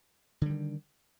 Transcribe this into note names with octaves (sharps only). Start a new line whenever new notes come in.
D3 D#3 G3